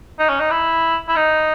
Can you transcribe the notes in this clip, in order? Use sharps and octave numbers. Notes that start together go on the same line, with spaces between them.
D#4
C#4
D#4
E4
E4
D#4